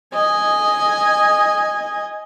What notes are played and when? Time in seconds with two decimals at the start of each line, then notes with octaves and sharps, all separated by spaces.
0.14 D#5 G#5